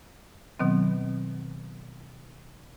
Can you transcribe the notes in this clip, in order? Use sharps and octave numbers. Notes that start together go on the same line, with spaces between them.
B2 D#3 F#3 B3 C4